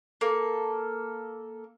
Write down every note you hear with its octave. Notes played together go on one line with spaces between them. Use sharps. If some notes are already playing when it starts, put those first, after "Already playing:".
A#3 A4